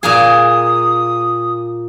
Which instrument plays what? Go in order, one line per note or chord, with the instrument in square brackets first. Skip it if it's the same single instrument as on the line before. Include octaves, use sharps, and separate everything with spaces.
[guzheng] A#2 A#3 G#4 [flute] D#6